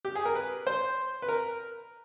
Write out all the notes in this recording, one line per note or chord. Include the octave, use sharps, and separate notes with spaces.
G4
G#4
A#4
B4
C5
B4
A#4